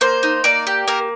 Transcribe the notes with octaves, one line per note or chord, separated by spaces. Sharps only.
A#3 C5
D#4
A#3 D5
G4
A#3 A#4